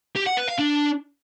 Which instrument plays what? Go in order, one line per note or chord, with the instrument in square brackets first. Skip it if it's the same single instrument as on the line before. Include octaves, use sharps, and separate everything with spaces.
[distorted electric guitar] G4
F#5
B4
F5
D4